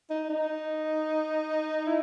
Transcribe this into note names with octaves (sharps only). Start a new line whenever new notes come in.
D#4
D#4
E4